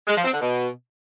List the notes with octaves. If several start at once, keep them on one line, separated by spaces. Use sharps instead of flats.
G#3
F3
C4
D3
B2